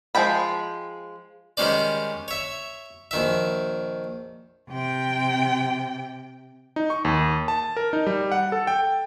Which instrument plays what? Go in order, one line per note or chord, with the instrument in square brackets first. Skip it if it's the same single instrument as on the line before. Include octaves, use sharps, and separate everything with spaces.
[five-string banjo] F3 G#3 G5 B5
[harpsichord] D#3 G3 G#3 C#4 C5 D5
C#5 E5
A#1 D#3 E5
[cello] C3 G5
[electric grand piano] D#4
C#6
D#2
A5
A#4
D#4
G3
F#5
A4
G5